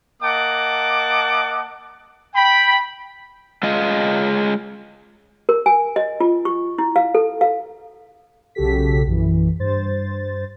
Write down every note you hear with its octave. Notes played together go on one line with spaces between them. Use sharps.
A#3 D#5 F#5 A5 D6
G5 B5
G#3 F4 D#5
A#4
G#5
D#5
F4
C#6
E4
F5
A4
F5
B1 C#3 F#4 G4 A4 B6
A#1 F#2 E3
G2 C5 A6